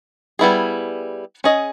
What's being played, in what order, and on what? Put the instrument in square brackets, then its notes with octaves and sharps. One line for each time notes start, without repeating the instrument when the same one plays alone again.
[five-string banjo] G3 B3 E4 G#4
C#4 G#4 D#5